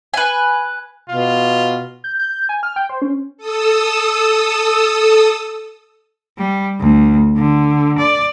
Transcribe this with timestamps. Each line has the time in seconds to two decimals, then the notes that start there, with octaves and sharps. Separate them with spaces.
0.14 B4 G#5
1.10 B2 F4
2.04 G6
2.19 G6
2.49 G#5
2.63 F6
2.76 G5
2.89 C5
3.02 C#4
3.38 A4 D#6 E6
6.38 G3
6.80 D2
7.37 D3
7.98 D5